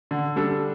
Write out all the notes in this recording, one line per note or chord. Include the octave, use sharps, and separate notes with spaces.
D3
G3 D4 A4